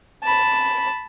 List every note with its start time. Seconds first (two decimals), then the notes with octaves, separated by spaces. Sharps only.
0.24 A5 B5